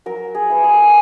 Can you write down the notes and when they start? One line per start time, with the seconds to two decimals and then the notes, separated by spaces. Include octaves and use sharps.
0.06 F#3 A#4
0.35 G#4
0.50 B3 E4
0.64 G#4
0.74 A#4
0.82 G#4